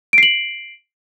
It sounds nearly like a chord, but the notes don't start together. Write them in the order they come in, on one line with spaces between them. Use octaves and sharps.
D7 C7 F#7